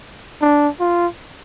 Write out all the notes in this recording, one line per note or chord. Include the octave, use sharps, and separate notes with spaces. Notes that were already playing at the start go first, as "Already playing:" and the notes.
D4
F4